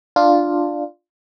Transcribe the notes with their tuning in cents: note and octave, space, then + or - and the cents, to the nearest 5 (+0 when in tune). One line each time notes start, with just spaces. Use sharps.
D4 +10 F4 +0